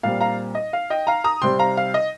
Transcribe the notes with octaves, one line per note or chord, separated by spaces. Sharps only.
A#2 G3 C4 F5
F5 A#5
D#5
F5
D#5 G5
F5 A#5
A#5 D#6
C3 G3 C4 G5 C6
F5 A#5
F5
D#5